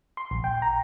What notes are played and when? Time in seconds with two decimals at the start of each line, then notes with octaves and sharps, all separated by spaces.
0.17 C6
0.31 A#1
0.44 G5
0.62 A#5